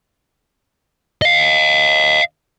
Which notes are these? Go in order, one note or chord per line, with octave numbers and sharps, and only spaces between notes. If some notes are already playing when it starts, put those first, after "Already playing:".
D#5 F5